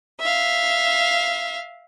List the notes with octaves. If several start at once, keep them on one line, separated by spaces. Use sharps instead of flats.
E5 F5